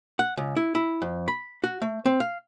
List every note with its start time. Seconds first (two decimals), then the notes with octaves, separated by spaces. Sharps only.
0.19 F#5
0.37 C#2
0.56 E4
0.75 E4
1.02 F2
1.28 B5
1.64 F#4
1.82 A3
2.06 C4
2.20 F5